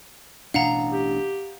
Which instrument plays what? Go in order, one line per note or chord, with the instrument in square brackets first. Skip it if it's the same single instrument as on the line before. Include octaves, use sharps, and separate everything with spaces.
[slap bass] A1 B2 D4 [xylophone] F5 F#5 A#5
[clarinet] G4